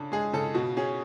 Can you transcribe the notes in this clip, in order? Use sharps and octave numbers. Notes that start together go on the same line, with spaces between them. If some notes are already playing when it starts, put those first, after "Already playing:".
Already playing: C#3 D4 A4
G#3 G#4
C#3 A4
B2 F#4
C#4 G#4